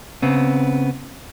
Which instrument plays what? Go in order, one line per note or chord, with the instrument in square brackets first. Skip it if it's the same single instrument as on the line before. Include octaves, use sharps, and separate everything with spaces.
[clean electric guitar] C#3 B3 C4